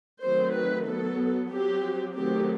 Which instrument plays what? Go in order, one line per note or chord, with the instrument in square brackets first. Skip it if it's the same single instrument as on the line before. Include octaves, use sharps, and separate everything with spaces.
[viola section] D#3 F#3 A3 C4 C5
B4
F#3 B3 A4
F#3 C4 G4
D#3 F#3 A3 C4 G4